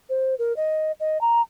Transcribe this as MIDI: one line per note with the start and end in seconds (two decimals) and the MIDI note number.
0.10 0.35 72
0.39 0.55 70
0.57 0.92 75
1.00 1.21 75
1.21 1.42 82